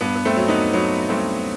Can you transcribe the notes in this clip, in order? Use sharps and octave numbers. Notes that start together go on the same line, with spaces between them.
G2 B3
B3
A3 C4
F#3
B3 D#4
F#3 B3 D#4
G2 A3 C4